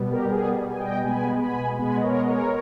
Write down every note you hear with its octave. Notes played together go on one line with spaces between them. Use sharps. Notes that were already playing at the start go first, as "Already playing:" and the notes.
Already playing: B2 G3 B3
G4 A#4
A#4
B2 G3 B3 G#4
G#5
D#5 G5
B2 G#3 B3 G#5 B5
G#5 B5
B2 G#3 B3 G#5 B5
D#5
A#4 C#5
D#5
A#4 C#5